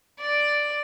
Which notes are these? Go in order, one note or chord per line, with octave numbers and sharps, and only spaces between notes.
D5